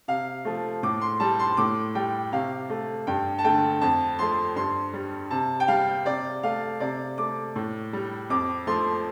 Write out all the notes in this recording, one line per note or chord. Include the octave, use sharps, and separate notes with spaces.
C3 F5
F3 A3
A2 D6
C6
G3 A5
C6
A2 D6
G3 G5
C3 F5
A3
G2 G5
A5
D3 A3 G5
F2 A5
F3 A3 C6
G2 C6
G3
C3 A5
G5
G3 F5
C3 D5
A3 F5
C3 D5
A3 D6
A2
G3
F2 D6
F3 A3 C6